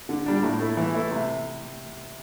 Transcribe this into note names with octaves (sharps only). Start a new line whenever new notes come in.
D3
G3 D4
A2
A3 E4
E3
A3 E4
C3